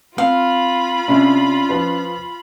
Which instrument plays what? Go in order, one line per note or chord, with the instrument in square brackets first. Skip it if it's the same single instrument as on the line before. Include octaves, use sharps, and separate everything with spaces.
[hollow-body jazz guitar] C4 [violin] F4 B5 [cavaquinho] F5
[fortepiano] C3 [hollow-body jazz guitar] C#4 D4
[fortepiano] F3 B4